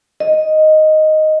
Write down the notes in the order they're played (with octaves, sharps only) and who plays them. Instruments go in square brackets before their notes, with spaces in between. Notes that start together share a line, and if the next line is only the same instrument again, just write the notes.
[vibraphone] D#5